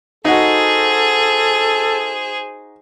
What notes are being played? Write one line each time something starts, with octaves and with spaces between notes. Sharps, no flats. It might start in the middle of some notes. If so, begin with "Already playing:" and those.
D#4 F#4 G#4 A4 C5